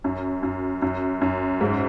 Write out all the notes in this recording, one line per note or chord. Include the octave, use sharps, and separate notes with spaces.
F#2
F#2
F#2
F#2
G#2